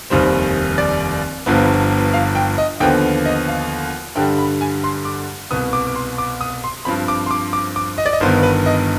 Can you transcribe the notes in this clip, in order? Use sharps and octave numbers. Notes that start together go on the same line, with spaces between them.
F1 D#2 D#3 G3 C4 C5
D5
G1 G2 F3 B3
F5
G5
D#5
D#2 D3 F3 B3 G5
D#5
F5
G2 D3 G3 G5
B5
G#5
C6
D6
C2 B2 B3 D#6
D6
D6
C6
D6
D#6
C6
G2 F3 C4 B5
D6
C6
D6
D6
D6
D#5
D5
D#5
G1 G2 D#3 B3 C5
B4
D#5